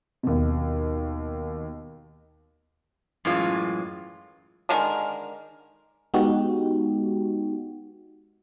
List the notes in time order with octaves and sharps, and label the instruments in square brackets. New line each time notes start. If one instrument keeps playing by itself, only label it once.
[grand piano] D#2 B2
[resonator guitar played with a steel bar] F#2 A2 E3 G#3 F4
[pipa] D3 D#3 G#3 A#4
[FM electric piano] G#3 B3 D#4 F#4 G4